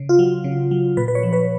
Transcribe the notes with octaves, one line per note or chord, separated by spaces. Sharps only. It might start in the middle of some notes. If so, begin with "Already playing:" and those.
Already playing: C#3
F4
F#3
C#3
F#3
A#2 B4
B4
C#5
F3
B4